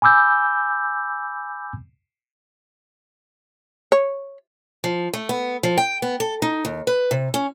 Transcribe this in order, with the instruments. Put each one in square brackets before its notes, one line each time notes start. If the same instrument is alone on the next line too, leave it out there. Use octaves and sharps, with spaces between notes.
[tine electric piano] G#5 B5 D6 E6 G6
[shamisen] C#5
[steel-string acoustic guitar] F3
A3
B3
F3
G5
B3
A4
D#4
D#2
B4
C3
C#4